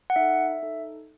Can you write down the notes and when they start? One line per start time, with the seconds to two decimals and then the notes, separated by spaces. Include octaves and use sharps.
0.10 F#5
0.16 D#4 A4 E5
0.63 D#4 A4